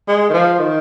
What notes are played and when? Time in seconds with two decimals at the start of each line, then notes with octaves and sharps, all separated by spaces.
0.08 G#3
0.30 D#3
0.33 F3
0.59 D#3